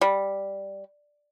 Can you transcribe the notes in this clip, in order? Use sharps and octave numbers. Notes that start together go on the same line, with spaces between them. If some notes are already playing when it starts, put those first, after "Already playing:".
G3